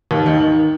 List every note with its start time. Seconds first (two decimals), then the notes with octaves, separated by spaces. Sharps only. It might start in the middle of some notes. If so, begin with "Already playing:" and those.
0.11 D#2
0.26 D#3
0.40 D#3